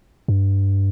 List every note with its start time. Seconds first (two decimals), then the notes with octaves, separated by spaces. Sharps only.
0.28 G2